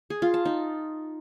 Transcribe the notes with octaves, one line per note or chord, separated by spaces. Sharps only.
G#4
F4
A5
D#4